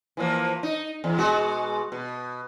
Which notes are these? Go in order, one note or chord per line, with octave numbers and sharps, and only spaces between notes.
E3 F3 A#3
D#4
E2
B2 G#3 F#4
B2